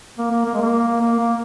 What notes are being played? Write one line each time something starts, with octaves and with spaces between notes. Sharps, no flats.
A#3
A#3
A#3
G#3
A#3
A#3
A#3